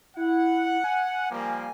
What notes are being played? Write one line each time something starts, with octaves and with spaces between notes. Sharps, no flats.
E4 F#5
G#5
F3 G3 A#3